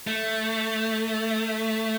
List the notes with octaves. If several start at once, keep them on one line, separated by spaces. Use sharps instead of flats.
A3